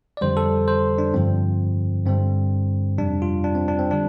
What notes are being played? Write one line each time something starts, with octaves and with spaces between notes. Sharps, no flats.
D5
F2 D3 G3 C5
A4
C5
D4
G2 D3 F3 C4
G2 D3 G3 C4
F2 C3 G3 D4
F4
D4
C4
D4
C4
D3 G3 D4